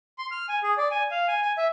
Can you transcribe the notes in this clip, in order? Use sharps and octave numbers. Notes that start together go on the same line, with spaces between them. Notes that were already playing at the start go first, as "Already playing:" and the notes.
C6
F6
G#5
G#4
D5
G#5
F5
G#5
G#5
E5